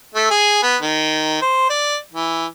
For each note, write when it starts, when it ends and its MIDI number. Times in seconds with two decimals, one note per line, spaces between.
0.14 0.28 57
0.31 0.60 68
0.63 0.77 59
0.82 1.37 51
1.42 1.68 72
1.70 1.97 74
2.13 2.46 52